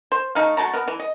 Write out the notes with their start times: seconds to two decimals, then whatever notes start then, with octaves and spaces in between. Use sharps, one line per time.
0.12 C5
0.35 A3 D#4 F5
0.57 F#3 A3 A5 A#5
0.73 B3 A#4
0.88 E3
0.99 D#5